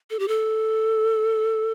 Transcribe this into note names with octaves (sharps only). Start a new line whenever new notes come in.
A4
G4
A4